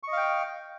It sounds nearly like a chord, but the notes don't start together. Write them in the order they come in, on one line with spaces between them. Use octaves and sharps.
C#6 D#5 F5 G5